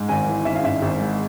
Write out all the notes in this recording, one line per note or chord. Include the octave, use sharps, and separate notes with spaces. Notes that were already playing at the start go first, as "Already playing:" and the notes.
Already playing: G#2 G#3
G#1 G#5
E3
G#1 E5
F5
G#2 E5
G#1
G#3